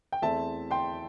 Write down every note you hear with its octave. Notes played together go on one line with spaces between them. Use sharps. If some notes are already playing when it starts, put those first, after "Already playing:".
G5
E2 E3 A3 C4 E4 E5 A5
G5 C6